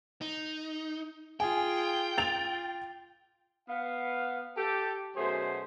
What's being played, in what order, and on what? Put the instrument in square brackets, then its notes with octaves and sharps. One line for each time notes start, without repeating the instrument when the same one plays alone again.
[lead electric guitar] D#4
[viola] F4 G#4 [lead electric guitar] G5 [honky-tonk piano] G#5
[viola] F4 [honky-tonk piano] A6 F7
[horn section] B3 F5
G4 A4
F#2 B2 A3 G#4 C5